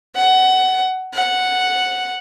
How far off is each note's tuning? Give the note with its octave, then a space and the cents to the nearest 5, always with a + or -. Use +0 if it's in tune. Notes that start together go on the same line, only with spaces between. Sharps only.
F#5 +15
F#5 -5